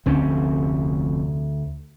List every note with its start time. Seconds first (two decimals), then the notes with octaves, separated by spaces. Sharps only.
0.06 F1 D2 C4 C#4